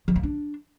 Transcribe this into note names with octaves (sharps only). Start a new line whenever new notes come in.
F3
A#3
D4